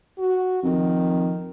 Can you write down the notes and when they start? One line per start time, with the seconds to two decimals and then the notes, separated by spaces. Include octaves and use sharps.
0.18 F#4
0.63 F2 D#3